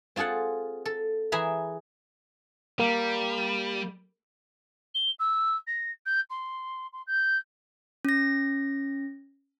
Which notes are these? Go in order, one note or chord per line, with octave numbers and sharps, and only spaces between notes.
C4 F4 G#4 A4 F#5
A4
E3 E4 G#4 E5 A#5 B5
G3 A#3
G7
E6
A#6
G6
C6
C6
G6
C#4 A#6